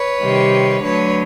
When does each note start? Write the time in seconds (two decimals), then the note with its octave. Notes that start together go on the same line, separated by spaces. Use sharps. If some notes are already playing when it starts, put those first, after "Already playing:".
Already playing: B4 C#5
0.20 C3 D#3 G3
0.84 D3 F#3 A3 B4 C#5